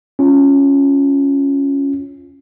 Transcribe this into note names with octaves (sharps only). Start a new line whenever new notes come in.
C#4 F4